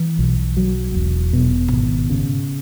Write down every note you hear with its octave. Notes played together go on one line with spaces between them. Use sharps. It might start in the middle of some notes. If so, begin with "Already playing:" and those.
Already playing: E3
B1
F#3
E1
B2
G#1
C#3